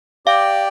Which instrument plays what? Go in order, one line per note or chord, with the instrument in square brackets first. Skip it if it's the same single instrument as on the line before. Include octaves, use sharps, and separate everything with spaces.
[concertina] G4 D5 G5 [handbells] F5